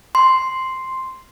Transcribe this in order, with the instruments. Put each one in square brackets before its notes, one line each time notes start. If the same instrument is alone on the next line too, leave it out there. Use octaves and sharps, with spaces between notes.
[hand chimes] C6